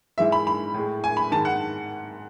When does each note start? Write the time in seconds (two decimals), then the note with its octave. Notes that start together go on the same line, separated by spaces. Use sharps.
0.18 G#2 E3 G#3 E5
0.32 B5
0.47 B5
0.74 A2 G#3
1.04 G#5
1.17 B5
1.31 G#2 D#3 G#3 A5
1.45 F#5